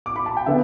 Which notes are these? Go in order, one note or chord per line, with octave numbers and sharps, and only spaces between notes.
D6
B5
A5
G5
D3 B3 E5